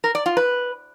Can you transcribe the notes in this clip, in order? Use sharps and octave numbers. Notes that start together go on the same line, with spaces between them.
A#4
D5
F4
B4